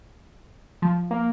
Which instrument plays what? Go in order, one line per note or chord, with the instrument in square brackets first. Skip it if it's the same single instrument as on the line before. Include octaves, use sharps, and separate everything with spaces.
[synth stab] F3
[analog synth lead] A#3